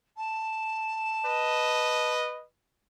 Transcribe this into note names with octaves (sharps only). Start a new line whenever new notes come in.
A5
B4 D#5